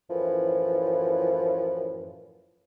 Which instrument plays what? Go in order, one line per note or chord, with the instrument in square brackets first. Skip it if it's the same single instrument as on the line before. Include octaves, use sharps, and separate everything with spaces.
[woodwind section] F#2 A2 E3 F3